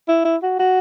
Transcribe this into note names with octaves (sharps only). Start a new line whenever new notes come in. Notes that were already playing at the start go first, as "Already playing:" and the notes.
E4
E4
F#4
F#4